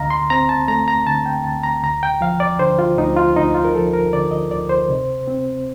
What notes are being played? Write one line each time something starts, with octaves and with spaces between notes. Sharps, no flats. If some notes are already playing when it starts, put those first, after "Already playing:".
Already playing: D2 D3 A3 D#5 F5 A#5
C6
C4 A#5
A5
A3 A#5
A#5
D3 A5
G5
D2 A5
A#5
D2 A#5
G5
F3 F5
D5
D3 C5
F4
D2 D#4
F4
D2 D#4
F4
A#4
F3 A4
A#4
D3 D5
D#5
D2 D5
C5
C3
C4